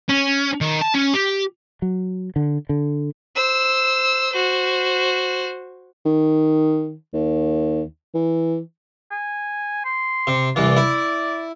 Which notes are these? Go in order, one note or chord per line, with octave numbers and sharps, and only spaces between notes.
C#4
D#3
A5
C#4
G4
F#3
D3
D3
C5 E6
F#4 C5
D#3
D#2
E3
G#5
C6
C3
C2 E3 D5
E4